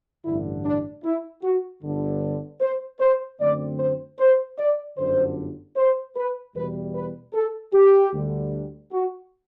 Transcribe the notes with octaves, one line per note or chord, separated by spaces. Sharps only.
A1 G2 D3 E4
D4
E4
F#4
G1 G2 D3
C5
C5
F#2 D3 A3 C4 D5
C5
C5
D5
G1 F#2 D3 C5
C5
B4
E2 B2 G3 B4
B4
A4
G4
D2 D3 G3
F#4